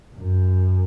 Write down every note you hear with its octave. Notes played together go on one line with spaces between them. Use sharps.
F#2